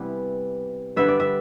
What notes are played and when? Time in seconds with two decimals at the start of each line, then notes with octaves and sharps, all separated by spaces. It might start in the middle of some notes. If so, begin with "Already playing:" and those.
Already playing: C3 E3 G3 B3
0.96 D3 G3 B3 E5
1.08 D5
1.20 E5